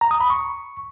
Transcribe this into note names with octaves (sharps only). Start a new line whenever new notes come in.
A#5
D#6
B5
C#6